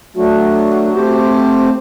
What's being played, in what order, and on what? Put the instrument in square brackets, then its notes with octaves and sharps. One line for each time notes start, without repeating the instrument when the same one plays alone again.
[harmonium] F#3 A3 D4 [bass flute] F#4
[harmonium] A3 C4 G4 C5